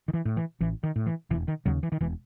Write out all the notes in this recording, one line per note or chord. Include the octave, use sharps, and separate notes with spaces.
D#3
E3
A2
E3
A1 E3
D#3
A2
E3
E1 E3
D#3
D#2 C#3 F#3
E3
D#3
E1 E3